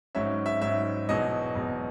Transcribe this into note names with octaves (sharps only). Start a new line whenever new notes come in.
G#1 G#2 F#3 C#4 E5
E5
G#1 G#2 F#3 C#4 E5
E1 E2 B2 F#3 D#5
E1 E2 B2 F#3